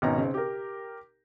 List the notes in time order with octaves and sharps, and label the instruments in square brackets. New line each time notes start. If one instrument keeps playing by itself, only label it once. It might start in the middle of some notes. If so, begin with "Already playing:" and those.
[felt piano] G#1 B2 C#4 A#5
C#3 C4
G4 A#4